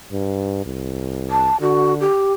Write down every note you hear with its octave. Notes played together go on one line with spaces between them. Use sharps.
G2
C2
A5
D3 F#4
G4